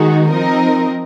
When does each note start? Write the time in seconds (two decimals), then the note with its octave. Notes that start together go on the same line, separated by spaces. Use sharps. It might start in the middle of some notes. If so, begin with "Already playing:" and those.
Already playing: D#3 G#3 D#4 F#4
0.29 F3 C4 D#4 A#4 D#5